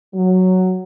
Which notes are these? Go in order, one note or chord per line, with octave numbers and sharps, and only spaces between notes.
F#3